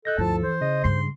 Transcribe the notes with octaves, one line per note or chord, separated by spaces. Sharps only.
A4 D#5 F#6 G6 A#6
D2 G2 F3 E4 A5
E3 C5
C#3 D#5
G2 G3 C6